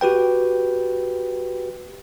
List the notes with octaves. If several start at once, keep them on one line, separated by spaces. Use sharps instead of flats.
F#4 G4 B4 G5